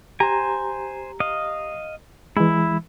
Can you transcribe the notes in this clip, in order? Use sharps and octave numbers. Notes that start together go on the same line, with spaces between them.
G4 C5 G#5 A#5
D#5 F5
E3 G#3 E4